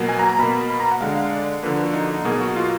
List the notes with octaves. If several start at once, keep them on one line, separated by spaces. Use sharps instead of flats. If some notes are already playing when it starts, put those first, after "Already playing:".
Already playing: B2 F#3 A#3
G#5
A#5
A#5
B2 A#3 B5
B5
A#5
F#5
D3 G#3 F5
F5
D5
D3 F3 A#3 B4
F#4
D#4
D#4
B2 F#3 A#3 G#4
F#4
F4